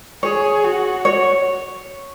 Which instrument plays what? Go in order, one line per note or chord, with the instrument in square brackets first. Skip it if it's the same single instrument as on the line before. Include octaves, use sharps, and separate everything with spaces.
[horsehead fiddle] G#4 [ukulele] C#5
[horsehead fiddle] F#4
[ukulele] C#5